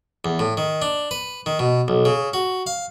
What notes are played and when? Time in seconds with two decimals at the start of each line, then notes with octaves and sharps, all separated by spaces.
0.25 E2
0.39 A2
0.57 D#3
0.82 D4
1.11 B4
1.46 D#3
1.59 B2
1.88 B1
2.05 C#3
2.34 F#4
2.67 F5